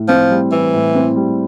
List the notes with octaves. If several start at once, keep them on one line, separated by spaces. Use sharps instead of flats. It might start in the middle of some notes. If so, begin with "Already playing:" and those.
Already playing: A2 E4
F3 C4
G3
E3 E4
A2
C4
G3